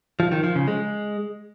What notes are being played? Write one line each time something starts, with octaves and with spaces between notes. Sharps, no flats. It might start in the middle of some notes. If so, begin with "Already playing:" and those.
F3
D#3
F3
C#3
G#3